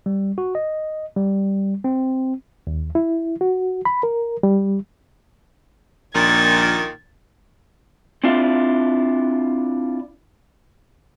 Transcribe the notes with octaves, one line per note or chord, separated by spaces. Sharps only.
G3
F#4
D#5
G3
C4
D#2
E4
F#4
B5
A#4
G3
A#1 A#2 D#3 G#6 A6
C4 D4 E4 F4